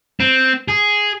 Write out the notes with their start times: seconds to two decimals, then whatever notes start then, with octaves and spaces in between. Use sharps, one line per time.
0.20 C4
0.68 G#4